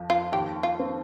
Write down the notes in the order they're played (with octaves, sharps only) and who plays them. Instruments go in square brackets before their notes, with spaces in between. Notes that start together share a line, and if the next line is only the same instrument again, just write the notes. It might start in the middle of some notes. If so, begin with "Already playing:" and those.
Already playing: [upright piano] F2 F3
[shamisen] F4
[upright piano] D#2 [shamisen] G4
[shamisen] F4
[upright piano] C4